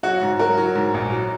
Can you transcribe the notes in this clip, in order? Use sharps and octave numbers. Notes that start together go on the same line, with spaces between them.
F#3 F#4
G#2
F#3 F#4 A#4
F#3
G#2
A#1
F#3